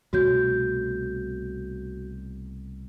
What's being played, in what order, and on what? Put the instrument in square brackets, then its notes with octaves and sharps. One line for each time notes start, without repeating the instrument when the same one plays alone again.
[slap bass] C2 B2 A3 [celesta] F#4 C#5 G6